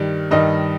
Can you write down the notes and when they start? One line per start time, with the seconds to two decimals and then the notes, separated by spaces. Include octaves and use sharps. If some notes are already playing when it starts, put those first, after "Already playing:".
Already playing: G2 D#3 G3
0.31 G2 D#3 G3 D#5